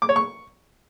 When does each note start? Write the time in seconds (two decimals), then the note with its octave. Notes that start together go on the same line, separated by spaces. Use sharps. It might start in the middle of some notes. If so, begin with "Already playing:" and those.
0.02 D6
0.09 C#5
0.16 C#6